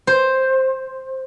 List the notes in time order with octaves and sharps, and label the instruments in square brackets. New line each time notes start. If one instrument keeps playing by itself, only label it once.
[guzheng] C5